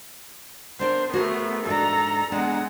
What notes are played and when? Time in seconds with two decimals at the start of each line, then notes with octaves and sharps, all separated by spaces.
0.79 B3 D4 A#4 C5
1.13 A3 B3 F#4 G#4 A#4
1.66 G#2 D4 A4 A#5
2.32 G#3 B3 D4 F#5